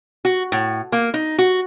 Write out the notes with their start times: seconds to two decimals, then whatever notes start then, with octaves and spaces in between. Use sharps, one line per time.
0.25 F#4
0.52 A2
0.92 A#3
1.14 D#4
1.38 F#4